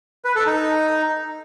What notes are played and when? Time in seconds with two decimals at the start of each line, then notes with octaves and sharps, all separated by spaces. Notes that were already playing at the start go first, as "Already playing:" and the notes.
0.25 B4
0.36 A4
0.47 D#4